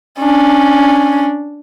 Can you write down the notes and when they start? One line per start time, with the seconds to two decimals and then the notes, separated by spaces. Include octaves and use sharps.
0.19 C#4 D4